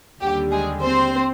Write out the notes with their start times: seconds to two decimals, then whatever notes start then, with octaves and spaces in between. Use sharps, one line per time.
0.21 D#2 D3 G3 G4
0.51 G#3 G#4
0.81 C4 C5